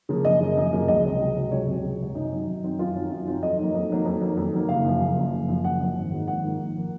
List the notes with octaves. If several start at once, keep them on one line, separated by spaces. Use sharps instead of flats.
C#3 F3 A#3
F#2 D#5
C#3 F3 A#3
F#2
C#3 F3 A#3
C#2 D#5
C3 F#3 C4
C#2
C3 F#3 C4
C#2 C#5
C3 F#3 C4
C#2
C3 F#3 C4
F#2 D#4
D#3 F#3 C4
F#2
D#3 F#3 C4
F#2 F4
D#3 F#3 C4
F#2
D#3 F#3 C4
F2 D#5
D#3 F#3 A#3
F2
D#3 F#3 A#3
F2
D#3 F#3 A#3
F2
D#3 F#3 A#3
F#1 F5
F#2 F3
F#1
F#2 F3
F#1
F#2 F3
F#1 F#5
F#2 F3
G#1
G#2 F3 A#3
G#1 F#5
G#2 F3 A#3
G#1
F3 A#3